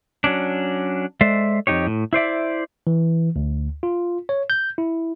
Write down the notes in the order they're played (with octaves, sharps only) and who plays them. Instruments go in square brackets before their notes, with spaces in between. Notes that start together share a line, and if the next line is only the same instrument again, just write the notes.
[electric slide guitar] F#3 C#4 D4
G#3 A4 C5 D5 E5
F2 C3 D#4 G4 C#5
A2
E4 C5 D5 E5
[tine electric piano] E3
D2
F4
C#5
G6
E4